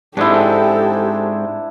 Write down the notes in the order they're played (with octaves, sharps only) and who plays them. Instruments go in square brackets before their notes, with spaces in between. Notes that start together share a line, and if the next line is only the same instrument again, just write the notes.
[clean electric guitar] G#2 G#3 C4 [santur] D4 E4 [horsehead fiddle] G4 A4